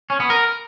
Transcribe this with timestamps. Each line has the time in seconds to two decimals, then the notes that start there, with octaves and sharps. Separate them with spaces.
0.10 C#4
0.20 B3
0.30 A#4